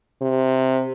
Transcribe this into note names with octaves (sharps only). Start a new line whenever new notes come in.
C3